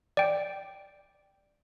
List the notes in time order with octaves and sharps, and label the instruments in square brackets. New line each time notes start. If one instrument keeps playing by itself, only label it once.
[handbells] D5 G5